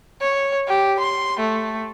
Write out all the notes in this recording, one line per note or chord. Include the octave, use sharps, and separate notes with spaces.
C#5
G4
C6
A3